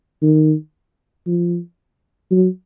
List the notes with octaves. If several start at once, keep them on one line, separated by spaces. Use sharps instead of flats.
D#3
F3
F#3